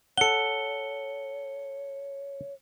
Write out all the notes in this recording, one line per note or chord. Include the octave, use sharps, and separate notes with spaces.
A4 C#5 F#5 C#7 G7